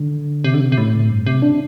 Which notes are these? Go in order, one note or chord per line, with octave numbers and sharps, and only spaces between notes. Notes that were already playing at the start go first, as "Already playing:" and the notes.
Already playing: D3
C3
D3
C3
C3
A2
G2
C3
D4